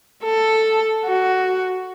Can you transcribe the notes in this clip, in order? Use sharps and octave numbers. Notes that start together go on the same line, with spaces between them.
A4
F#4